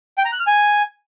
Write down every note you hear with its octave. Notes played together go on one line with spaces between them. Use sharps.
G5
A#5
F#6
F6
G#5